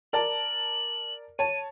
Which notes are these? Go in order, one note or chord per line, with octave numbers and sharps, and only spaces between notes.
A#4 D5 A5 F#7
C#5 A5 D#7